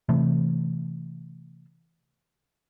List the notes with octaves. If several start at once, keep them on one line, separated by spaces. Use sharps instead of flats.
C3 E3 A3